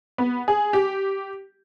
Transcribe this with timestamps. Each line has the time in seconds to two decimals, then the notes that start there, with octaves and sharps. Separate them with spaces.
0.18 B3
0.48 G#4
0.73 G4